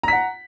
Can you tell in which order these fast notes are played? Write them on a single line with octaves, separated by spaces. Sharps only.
A#5 B6 F#5